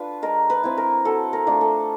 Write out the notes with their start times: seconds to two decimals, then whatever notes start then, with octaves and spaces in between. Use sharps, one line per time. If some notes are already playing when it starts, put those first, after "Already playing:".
Already playing: D4 F4 B4
0.22 G#3 A#4
0.50 B4
0.64 C4 E4
0.78 A#4
1.05 F#3 A4
1.33 A#4
1.47 A3 D4 F4
1.61 A4